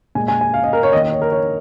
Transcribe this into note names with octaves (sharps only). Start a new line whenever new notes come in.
A#2 G#3 G#5
G#5
G#5
F5
D#5
A#4
C#5
D#3 A#3 D#5
D#5
C#5
A#4
C#5